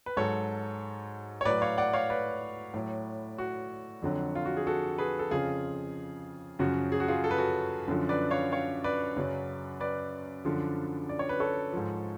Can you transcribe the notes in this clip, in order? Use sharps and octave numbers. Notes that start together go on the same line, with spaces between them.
B4
G#2 F#3 A4 C#5
C#5
A2 F#3 B4 D5
C#5 F5
D5 F#5
C#5 F5
B4 D5
A2 F#3
F#4
F2 D3 F#3
F4
F#4
G#4
F#4 A4
G#4 B4
A4
F2 C#3 F3 F4 G#4
F#2 C#3 F3 F#4
G#4
F#4
F4 G#4
A4
B4
F#4 A4
F#2 D3 F3
B4 D5
C#5 F5
C#5 F5
B4 D5
F#2 C#3 F#3
B4 D5
F#2 D3 F3
D5
C#5
B4
A4 C#5
G#2 F3